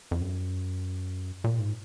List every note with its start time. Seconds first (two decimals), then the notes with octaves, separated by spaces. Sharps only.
0.11 F2
0.21 F#2
1.44 A#2
1.60 G#2